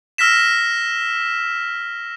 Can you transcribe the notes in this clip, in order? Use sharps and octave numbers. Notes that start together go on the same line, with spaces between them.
E6 F6 A#6 B6 E7